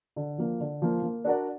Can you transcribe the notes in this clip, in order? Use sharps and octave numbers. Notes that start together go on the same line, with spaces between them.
D3
F3 A#3
D3
F3 A#3
A#3
D4 F#4 A#4 D5